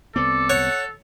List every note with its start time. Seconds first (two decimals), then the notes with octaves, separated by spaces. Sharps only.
0.16 C2 B3 C4 A4 D5
0.50 C#5 F#5